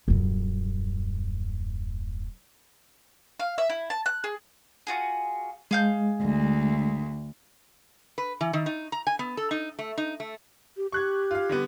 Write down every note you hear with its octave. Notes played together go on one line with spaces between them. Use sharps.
D#1 F#2
F5
E5
E4
A5
F#6
G#4
F4 F#4 G#4
G#3 G#4 F5 G6
D2
B4
E3
D#3
D#4
A#5
G#5
B3
A4
D#4
A3
D#4
A3
G4
G4 C#6 F#6 G#6
F4 F5
D3 G3 B3